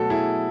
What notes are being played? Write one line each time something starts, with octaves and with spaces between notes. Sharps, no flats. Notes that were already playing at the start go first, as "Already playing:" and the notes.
Already playing: B2 F#3 A3 F#4 A4
E4 G#4